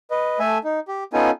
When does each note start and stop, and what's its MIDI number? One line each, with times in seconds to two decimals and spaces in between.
0.11 0.39 71
0.11 0.39 75
0.39 0.58 57
0.39 0.58 69
0.39 0.58 76
0.39 0.58 80
0.64 0.80 63
0.88 1.04 67
1.13 1.31 59
1.13 1.31 61
1.13 1.31 63
1.13 1.31 65
1.13 1.31 69
1.13 1.31 80